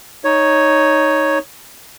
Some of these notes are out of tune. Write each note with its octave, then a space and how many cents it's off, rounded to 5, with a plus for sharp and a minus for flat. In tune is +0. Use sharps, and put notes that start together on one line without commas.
D#4 +0 C#5 +0